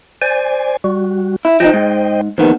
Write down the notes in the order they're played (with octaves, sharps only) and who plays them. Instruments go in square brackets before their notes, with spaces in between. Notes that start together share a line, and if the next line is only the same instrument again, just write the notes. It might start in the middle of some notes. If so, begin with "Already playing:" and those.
[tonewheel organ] C5 D5 G#5
G3 F#4
[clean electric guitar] E4
[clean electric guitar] F3 D#4 [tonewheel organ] C5 D#5 G5
[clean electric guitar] G#2
[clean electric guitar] D#2 D#3 B3 [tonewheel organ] F3